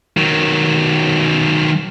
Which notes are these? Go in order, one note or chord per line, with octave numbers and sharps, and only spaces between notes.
D#3 F#3